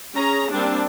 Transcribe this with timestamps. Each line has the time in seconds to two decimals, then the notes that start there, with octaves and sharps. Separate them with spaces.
0.16 C#4 G#4 A#5
0.52 G3 A#3 C4 D4